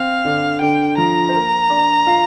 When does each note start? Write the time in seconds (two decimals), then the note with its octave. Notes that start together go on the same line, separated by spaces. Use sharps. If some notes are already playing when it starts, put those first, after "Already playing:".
Already playing: C4 F5
0.25 D3 D4
0.61 D3 D4 G5
0.98 F3 F4 A#5
1.29 C5
1.34 A#3 A#4
1.70 D4 D5
2.07 F4 F5